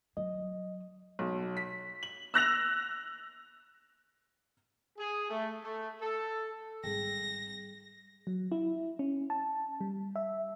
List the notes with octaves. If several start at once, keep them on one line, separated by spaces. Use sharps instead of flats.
F#3 D#5
B1
B6
F#7
E6 F#6 A#6 F7
G#4
A3
A3
A4
G#1 G3 G#4 A#6
F#3
E4
C#4
A5
G3
E5